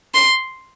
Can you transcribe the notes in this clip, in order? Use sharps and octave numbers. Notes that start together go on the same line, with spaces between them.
C6